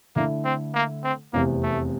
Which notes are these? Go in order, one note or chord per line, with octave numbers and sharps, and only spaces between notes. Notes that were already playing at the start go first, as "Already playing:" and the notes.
D3 A3 A#3 E4
C4
A#3
C4
F1 E2 C3 A#3
A3